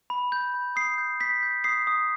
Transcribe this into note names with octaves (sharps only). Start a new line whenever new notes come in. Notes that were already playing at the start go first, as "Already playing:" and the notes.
B5
G6
B5
D#6 C7
G6
G6 B6
G6
D#6 C7
D#6